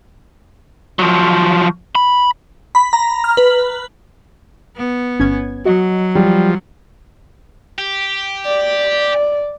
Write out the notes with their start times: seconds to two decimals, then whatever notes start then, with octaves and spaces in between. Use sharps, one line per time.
0.99 F3 F#3
1.95 B5
2.75 B5
2.93 A#5
3.24 F6
3.37 B4
4.76 B3
5.19 G1 C#4 G#6
5.65 F#3 F#4 D#5
6.15 F3 G3
7.78 G4
8.46 D5